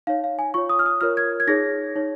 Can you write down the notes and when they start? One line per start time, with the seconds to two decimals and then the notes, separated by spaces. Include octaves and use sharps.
0.07 D#4 C#5 F5
0.24 F5
0.39 G#5
0.54 F4 C#5 C#6
0.69 D#6
0.79 F6
0.86 D#6
1.01 F4 A#4 C#5 F6
1.17 G#6
1.40 G#6
1.47 D#4 G#4 C#5 A#6
1.95 D#4 C#5